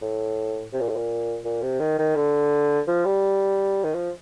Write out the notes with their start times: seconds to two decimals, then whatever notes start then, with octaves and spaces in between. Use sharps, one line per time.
0.02 A2
0.73 C3
0.81 A#2
0.89 A2
0.96 A#2
1.45 A#2
1.62 C3
1.80 D#3
1.99 D#3
2.16 D3
2.88 F3
3.05 G3
3.84 D#3
3.94 F3